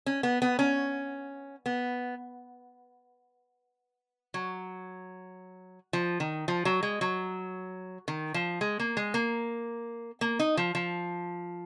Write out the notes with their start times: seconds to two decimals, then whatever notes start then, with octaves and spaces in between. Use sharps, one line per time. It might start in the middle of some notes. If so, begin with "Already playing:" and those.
0.06 C#4
0.23 B3
0.42 B3
0.59 C#4
1.66 B3
4.34 F#3
5.93 F3
6.20 D#3
6.48 F3
6.65 F#3
6.83 G#3
7.01 F#3
8.08 D#3
8.34 F3
8.61 G#3
8.80 A#3
8.97 G#3
9.14 A#3
10.21 A#3
10.39 D#4
10.57 F3
10.75 F3